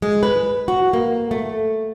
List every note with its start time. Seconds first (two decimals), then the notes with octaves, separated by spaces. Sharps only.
0.02 G#3
0.23 B4
0.68 F#4
0.93 A#3
1.31 A3